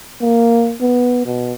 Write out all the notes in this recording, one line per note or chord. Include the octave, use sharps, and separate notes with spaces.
A#3
B3
B2